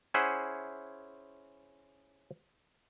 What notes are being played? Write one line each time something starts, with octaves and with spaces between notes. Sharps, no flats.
C#4 E4 G#4 C5 E5 F#5